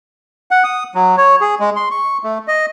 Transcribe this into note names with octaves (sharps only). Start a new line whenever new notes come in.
F#5
D#6
F#3
C#5
G#4
G#3
C6
C#6
A3
D#5